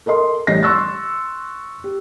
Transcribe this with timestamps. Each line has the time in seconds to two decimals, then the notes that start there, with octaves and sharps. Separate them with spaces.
0.06 A4 A#4 D#5 C6
0.47 A1 G3 D#5 A#6 C7
0.63 C6 C#6 E6 F#6 A6
1.84 G4